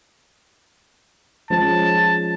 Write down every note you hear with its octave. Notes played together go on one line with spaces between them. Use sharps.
F3 G#3 C#4 A5